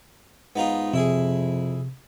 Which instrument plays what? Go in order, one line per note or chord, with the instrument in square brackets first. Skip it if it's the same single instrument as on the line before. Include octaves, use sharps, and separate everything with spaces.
[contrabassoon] G#2 [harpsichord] B3 D#4 F4
[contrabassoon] F2 [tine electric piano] C3 [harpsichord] E4 G#4